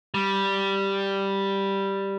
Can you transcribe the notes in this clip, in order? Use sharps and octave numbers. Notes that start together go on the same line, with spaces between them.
G3